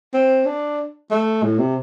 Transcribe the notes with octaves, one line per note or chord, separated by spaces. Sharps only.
C4
D4
A3
A2
C3